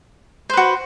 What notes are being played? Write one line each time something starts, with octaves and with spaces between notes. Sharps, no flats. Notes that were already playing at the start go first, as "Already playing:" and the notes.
F#4 B4 C5